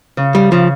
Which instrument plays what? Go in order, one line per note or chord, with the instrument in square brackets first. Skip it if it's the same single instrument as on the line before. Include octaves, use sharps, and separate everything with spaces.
[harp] C#3
[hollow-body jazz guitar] G3
[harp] C#3 [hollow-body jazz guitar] F3